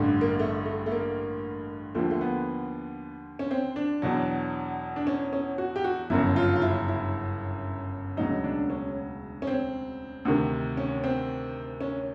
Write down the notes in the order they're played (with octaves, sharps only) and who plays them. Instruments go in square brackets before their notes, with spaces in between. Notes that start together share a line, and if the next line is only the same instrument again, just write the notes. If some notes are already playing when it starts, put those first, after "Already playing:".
Already playing: [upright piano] A1 G2 D3
A#3
A3
A3
A3
A#3
D#2 D3 F3 A3
A3
B3
C#4
C4
D4
E2 B2 F#3
D4
C#4
C#4
F#4
G4
F#4
G1 F#2 C#3 F#3 E4
F4
F4
E4
E4
E1 D2 C#3 F#3 D#4
D4
C#4
C#4
C4
D2 C3 D#3
C#4
C4
C#4